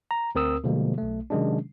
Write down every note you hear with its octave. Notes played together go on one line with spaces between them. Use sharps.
A#5
D2 C4 A#4 D#6 E6
B2 D3 F3 G3 G#3 A#3
B1 A3
C3 D#3 F#3 G#3 C#4 D4